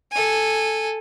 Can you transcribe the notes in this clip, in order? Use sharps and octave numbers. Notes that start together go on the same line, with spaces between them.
A4 G#5